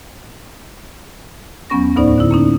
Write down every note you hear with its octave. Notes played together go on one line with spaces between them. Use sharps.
E2 F#3 B3 C#4 C#6 A#6
D2 A2 B3 D#4 C5 D5
D3 E4
A#3 C#4 D#4